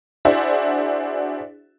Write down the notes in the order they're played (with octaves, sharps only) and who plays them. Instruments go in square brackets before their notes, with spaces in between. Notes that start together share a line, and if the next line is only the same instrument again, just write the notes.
[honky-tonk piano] D4 E4 F#4 G#4 C5 E5